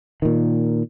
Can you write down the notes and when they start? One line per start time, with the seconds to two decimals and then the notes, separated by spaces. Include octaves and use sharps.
0.22 A#2 D#3